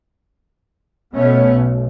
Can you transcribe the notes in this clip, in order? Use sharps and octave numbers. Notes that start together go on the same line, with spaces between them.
B2 A3 B3 C#4
B1